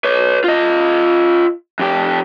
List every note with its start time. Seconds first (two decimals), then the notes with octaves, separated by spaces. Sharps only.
0.04 B4 C#5
0.44 F4 D#5
1.79 F2 G4